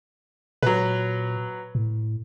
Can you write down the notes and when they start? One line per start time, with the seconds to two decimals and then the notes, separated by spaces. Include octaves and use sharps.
0.62 A#2 F#3 B4
1.75 A2